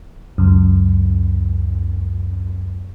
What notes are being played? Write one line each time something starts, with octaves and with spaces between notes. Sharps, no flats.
C#2 F#2